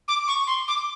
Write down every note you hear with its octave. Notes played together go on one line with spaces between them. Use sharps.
D6
C#6
C6
D6